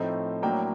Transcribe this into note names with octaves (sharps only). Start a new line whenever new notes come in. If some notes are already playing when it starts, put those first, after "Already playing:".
Already playing: A2 F3 A3 C4 D#4
A2 F#3 A#3 D4 G5